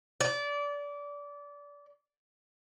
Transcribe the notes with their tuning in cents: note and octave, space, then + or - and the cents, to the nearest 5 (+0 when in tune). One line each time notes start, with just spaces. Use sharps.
D5 -25